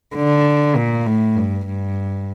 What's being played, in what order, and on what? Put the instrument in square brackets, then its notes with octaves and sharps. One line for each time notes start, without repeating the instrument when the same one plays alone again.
[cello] D3
A#2
A2
G2
G2